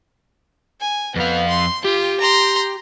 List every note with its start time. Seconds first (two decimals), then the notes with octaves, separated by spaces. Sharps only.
0.81 G#5
1.16 F2 B3 F5
1.49 C6
1.84 F4 G4
2.20 A#5 C6